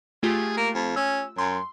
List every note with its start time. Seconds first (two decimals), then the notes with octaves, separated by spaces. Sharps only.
0.23 A3 F4 G4 G#4
0.57 A#3
0.75 F2
0.96 C#4 E6
1.38 F#2 C6